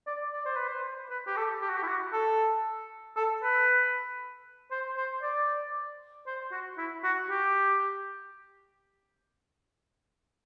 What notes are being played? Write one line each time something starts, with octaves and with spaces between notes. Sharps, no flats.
D5
D5
C5
B4
C5
B4
G4
A4
G4
F#4
G4
E4
F#4
A4
A4
B4
C5
C5
D5
C5
F#4
E4
F#4
G4